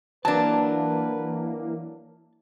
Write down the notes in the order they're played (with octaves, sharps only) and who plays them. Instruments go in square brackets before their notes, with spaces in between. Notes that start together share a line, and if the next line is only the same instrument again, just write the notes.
[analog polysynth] E3 A#3 [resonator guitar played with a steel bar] F#3 D4 [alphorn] B4 [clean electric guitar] A5